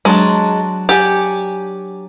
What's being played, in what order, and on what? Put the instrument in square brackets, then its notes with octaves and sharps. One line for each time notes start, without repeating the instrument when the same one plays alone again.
[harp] F#3 D4 A5 [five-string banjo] G#3
[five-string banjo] G4 [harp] D5 F#5 G#5